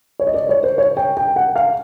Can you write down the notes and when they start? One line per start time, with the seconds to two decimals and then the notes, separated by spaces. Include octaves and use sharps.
0.19 C#5
0.27 D#5
0.34 D5
0.49 C#5
0.64 C5
0.78 C#5
0.97 G5
1.17 G5
1.36 F#5
1.56 F5